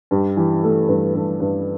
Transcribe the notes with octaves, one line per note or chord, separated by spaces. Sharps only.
G2 G4
E3 G4
A3 A4
G2 B4
G2 A4
G2 B4